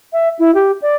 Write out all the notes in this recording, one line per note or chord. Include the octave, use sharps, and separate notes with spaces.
E5
E4
G4
D5